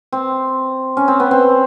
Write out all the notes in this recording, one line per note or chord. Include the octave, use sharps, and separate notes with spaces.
C4
C#4
C4
B3
C4